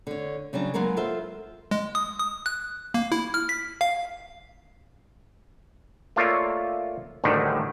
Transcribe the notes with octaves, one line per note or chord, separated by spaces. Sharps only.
D3 C#5
C#3 F#3 G3 D4
F#3 G#3 A#3 B3 F#4 A#4
F4 A4 C5 E5
G#3
D#6
D#6
F#6
A#3
E4
F6
B6
F5
A3 A#3 F4 C#5 D5 E5
A1 D2 A2 D#3 G3 A3